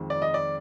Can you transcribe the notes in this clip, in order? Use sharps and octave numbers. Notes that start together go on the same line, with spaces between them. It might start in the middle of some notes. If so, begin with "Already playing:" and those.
Already playing: F2 D#3 G#3
D5
D#5
D5